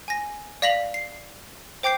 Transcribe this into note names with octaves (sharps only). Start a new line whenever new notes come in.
G#5 A#6
D5 F5 A#6 B6 F7 F#7
C7
C5 G5 D6 G6 C7